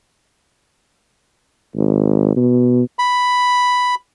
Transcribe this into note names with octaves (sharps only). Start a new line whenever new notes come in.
G#1
B2
B5